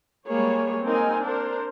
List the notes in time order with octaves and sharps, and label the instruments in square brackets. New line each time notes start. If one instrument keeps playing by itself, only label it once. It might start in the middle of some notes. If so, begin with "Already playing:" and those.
[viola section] G3 G#3 A#3 G#4 C#5
A#3 C4 D#4 A#4 G#5
D4 A#4 C5